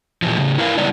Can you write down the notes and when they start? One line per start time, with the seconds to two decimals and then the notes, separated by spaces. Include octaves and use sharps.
0.22 A#2 E3 F3
0.37 A2 C#3 G3
0.58 E4 A#4 B4 F5
0.78 C#3 G3 B3 D#4 E4 D5